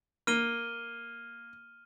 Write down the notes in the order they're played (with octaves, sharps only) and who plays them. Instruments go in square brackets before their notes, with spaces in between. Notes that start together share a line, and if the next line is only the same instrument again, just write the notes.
[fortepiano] A#3 [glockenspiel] F6 D#7 G7